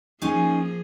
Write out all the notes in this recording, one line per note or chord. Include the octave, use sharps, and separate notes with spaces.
F3 A#3 C#4 D#4 G#4 G#5